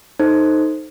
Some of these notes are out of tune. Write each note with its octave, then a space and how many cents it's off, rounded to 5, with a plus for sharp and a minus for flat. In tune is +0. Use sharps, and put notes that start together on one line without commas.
D#4 +0 A4 +0 C5 +0